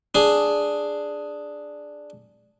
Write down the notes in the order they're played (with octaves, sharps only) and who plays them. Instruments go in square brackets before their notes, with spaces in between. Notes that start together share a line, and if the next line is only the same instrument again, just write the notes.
[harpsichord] D4 G#4